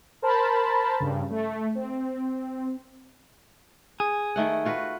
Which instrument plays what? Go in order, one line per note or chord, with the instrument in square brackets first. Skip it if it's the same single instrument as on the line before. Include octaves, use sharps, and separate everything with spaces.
[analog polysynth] A#4 C5 A5 B5
G2 C#3
A3
C4
[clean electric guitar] G#4
[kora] D#3 A3 F#5
F4 F#4 B4